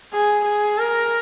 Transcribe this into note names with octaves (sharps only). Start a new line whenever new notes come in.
G#4
G#4
A#4